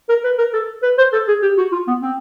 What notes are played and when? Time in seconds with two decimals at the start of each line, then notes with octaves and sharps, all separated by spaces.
0.09 A#4
0.24 B4
0.38 A#4
0.53 A4
0.83 B4
0.98 C5
1.13 A4
1.28 G#4
1.42 G4
1.58 F#4
1.72 F4
1.87 B3
2.02 C4